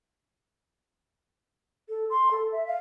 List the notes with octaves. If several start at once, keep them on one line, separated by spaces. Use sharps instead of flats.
A4
C6
A4
E5
F5